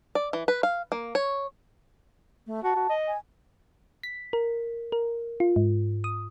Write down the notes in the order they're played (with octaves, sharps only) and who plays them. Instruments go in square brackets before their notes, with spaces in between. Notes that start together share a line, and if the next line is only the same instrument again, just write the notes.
[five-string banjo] D5
E3
B4
F5
A#3
C#5
[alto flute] A3
[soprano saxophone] F#4 [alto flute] A5
[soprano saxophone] F#4
D#5
[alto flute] G#5
[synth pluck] B6
A#4
A#4
F4
G#2
D#6